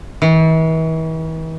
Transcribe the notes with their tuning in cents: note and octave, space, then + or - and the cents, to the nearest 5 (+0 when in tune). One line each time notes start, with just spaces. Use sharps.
E3 -40